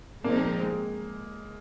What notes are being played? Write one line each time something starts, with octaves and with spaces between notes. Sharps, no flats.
A#2 F3 G#3 A#3 C4 D#4
A#3
G#3